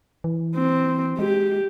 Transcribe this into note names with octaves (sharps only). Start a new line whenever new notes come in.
E3
C4
G#3 G4